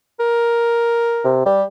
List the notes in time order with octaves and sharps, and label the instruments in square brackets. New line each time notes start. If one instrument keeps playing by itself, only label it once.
[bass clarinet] A#4
[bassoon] C3
[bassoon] G3 [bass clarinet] G4